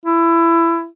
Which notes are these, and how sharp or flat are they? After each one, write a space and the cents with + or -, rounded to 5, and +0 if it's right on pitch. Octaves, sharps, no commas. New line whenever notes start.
E4 +20